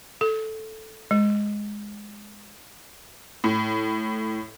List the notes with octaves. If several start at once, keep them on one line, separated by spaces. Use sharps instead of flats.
A4
G#3
A2